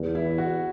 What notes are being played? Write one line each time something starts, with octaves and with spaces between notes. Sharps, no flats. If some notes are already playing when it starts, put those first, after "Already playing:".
Already playing: E2
E4
F#4